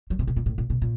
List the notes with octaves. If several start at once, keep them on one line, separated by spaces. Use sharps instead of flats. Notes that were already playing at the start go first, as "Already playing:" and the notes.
F#3
C3
B2
A#2
A2
A#2
B2
A#2